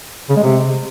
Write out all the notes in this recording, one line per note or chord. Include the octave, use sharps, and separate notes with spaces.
C#3
G#3
C3